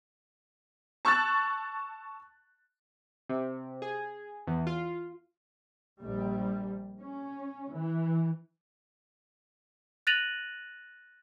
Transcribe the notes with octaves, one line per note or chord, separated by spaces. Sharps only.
A5 C#6 E6 F#6 A6
C3
G#4
E2
F4
A#1 G3
C#4
E3
F#6 A6 A#6 D#7 F7 F#7